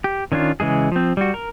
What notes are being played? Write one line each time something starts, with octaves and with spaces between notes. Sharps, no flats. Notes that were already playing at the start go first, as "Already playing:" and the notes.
G4
D#3 C#4 D4 F4
C#3 E3 G#3 G#4
F3 C4
G3 F#4
A#4